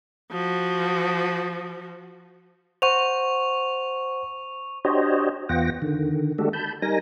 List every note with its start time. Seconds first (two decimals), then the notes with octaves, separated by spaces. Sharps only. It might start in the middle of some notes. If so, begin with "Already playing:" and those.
0.32 F3 F#4
2.82 C5 F#5 C#6 F7
4.85 D4 F#4 G4 C5 C#5 D#5
5.49 E2 B3 F4 F#5 G5 A#6
5.82 D3 D#3
6.38 G#3 A3 D4 F#4 G4 A4
6.53 A5 B5 G6
6.82 G3 D#4 A#4 G#5 A#6